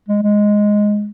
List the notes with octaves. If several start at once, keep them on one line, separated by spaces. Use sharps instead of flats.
G#3
G#3